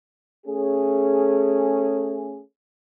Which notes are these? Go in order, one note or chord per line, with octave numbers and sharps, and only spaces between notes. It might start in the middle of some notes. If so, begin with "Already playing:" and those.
A3 C#4 G#4